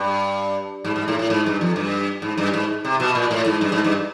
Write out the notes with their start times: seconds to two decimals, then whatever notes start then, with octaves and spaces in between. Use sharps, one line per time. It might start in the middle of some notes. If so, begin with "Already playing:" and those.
Already playing: G2
0.85 G#2
0.96 G#2
1.08 A2
1.19 A2
1.30 G#2
1.46 G2
1.61 F2
1.76 G2
2.22 G#2
2.38 G2
2.54 G#2
2.85 C3
3.00 B2
3.15 A#2
3.31 A2
3.46 G#2
3.61 G2
3.72 G#2
3.84 G2